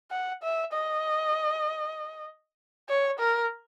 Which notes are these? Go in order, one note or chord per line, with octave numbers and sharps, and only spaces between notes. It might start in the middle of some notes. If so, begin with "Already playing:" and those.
F#5
E5
D#5
C#5
A#4